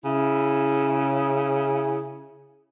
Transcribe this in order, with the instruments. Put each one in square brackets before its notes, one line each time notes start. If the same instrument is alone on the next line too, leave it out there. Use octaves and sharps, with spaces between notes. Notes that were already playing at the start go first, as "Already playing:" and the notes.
[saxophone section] C#3 E4